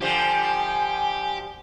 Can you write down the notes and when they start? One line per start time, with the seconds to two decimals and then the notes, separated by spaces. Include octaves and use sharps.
0.02 D3 F3 G3 G4 G#5